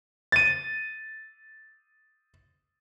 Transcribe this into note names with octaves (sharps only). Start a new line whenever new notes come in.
A6 D#7